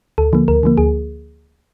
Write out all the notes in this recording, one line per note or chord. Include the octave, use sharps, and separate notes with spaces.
D2 A4
D3 F3 A#3
D2 A#4
D3 F3 A#3
D2 G#4